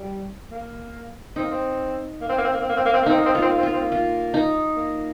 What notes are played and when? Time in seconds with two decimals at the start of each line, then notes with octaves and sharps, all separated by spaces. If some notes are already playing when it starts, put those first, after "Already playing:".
Already playing: G3
0.51 A#3
1.36 C4 D#4
1.43 A#3
1.51 C4
2.21 A#3
2.29 C4
2.38 A#3
2.45 C4
2.53 A#3
2.61 C4
2.69 A#3
2.77 C4
2.85 A#3
2.93 C4
3.02 A#3
3.06 C4 D#4
3.18 A#3
3.26 C4
3.33 A#3 F4
3.42 C4
3.50 A#3
3.58 C4
3.63 A#3 F4
3.73 C4
3.81 A#3
3.92 F4
4.34 D#4
4.76 A#3